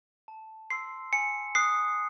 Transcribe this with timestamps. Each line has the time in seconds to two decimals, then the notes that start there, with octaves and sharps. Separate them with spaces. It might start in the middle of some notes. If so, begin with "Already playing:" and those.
0.28 A5
0.70 C6 E6 C7
1.13 G#5 C#7
1.55 D#6 F#6 C7